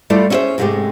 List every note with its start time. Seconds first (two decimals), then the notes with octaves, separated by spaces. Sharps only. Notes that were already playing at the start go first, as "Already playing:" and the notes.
0.10 G3 A3 E4 F4 A4 D5
0.30 C#4 E4 G4 G#4 C5 E5
0.58 G#2 C3 G#3 A3 C#4 G4